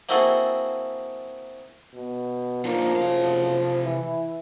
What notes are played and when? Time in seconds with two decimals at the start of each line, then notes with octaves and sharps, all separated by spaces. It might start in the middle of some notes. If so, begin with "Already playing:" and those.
0.09 A#3 C4 E4 F#4 G#4 A4
1.94 B2
2.65 F3 A#3 D4 D#4 F4
2.96 F#1 C3 F5
3.84 E3 E4